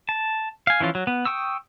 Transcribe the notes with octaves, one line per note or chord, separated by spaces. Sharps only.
A5
F5 G#5
E3 F3 C#4 F4
F#3
B3
G5 C#6 D#6 E6